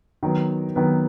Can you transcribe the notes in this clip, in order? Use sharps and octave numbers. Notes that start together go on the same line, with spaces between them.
D#3 F#3 B3
D#3 F#3 B3